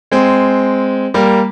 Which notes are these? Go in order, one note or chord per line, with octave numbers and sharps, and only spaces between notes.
G#3 C4
G3 A#3